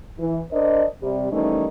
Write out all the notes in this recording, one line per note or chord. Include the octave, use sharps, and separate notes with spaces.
E3
D4 A#4 C5 D5 D#5
C3 G3
D#3 E3 G3 A3 C#4 D#4